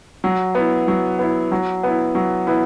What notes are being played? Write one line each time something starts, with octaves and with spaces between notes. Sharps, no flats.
F#3
B3 E4
F#3
B3 E4
F#3
B3 E4
F#3
B3 E4